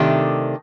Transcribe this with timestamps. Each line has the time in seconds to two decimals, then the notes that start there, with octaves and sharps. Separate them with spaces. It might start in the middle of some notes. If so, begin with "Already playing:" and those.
Already playing: C3 D#3 A3 D4 G4